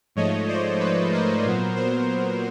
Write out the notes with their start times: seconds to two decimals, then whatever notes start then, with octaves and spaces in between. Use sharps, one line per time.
0.16 G#2 F3 A3 C#5 D#5
0.48 C5 D5
0.80 B4 C#5
1.13 A#4 C5
1.45 A#2 F#3 B3
1.76 A#4 C5